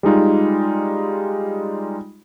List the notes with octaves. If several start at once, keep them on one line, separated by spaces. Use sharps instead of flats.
G3 G#3 D#4 F4